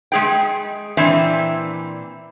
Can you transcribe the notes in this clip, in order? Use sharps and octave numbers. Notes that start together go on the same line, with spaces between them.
G#3 G#4 G5
A#2 E3 C4 D4 E5 G#5